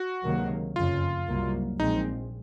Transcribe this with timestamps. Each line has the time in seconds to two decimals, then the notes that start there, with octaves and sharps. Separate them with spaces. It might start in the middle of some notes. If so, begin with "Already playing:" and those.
Already playing: F#4
0.24 C#2 C3 D#3 F#3 A#3
0.76 F#1 F2 C#3 F4
1.28 C2 C3 F#3 A#3
1.79 A#1 A#2 F3 G#3 C4 D#4